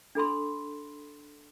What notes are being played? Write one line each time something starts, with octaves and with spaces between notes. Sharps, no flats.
D4 A4 B5 C6